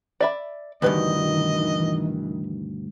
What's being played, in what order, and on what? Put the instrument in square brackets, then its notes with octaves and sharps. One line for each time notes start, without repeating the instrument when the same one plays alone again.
[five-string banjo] D5 E5 B5
[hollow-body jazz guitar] D2 G2 B2 [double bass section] D#3 E3 [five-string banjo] G4 B4 [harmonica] D#5